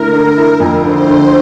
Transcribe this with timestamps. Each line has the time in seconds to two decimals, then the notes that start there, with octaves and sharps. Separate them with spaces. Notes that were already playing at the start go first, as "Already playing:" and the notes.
Already playing: D3 A3 E4 A#4
0.13 D3
0.37 E4
0.60 F2
0.83 D3 C5
1.08 D3